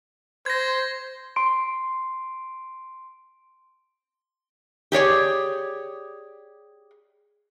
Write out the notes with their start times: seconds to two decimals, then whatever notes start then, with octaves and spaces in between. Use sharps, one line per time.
0.46 C5 G#6 A#6
1.36 C6 D7
4.92 G4 G#4 C#5 D5